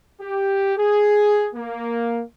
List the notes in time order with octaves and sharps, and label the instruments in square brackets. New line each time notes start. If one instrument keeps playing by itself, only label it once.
[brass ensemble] G4
G#4
A#3